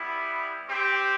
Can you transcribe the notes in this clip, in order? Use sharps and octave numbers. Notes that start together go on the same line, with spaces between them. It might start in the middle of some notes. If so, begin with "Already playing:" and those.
Already playing: G3 B3 E4 G4
C4 G4